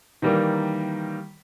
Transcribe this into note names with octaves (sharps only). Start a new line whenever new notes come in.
D#3 E3 G3 A#3